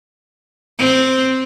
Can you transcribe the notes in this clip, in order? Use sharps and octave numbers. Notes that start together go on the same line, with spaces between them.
C4